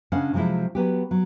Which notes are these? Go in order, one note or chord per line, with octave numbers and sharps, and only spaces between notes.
C#3 C#4 D4 D#5 F5 F#5
C3 F3 F#3 G#3 E4
F#3 B3 G4
F#3